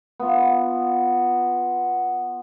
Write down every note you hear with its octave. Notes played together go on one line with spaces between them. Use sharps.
B3 F4